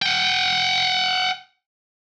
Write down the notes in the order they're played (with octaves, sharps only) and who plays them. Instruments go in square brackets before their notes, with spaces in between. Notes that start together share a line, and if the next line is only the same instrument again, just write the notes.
[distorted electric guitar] F#5 G5